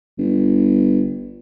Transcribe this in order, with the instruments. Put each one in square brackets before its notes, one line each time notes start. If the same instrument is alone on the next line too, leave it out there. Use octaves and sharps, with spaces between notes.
[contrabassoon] G1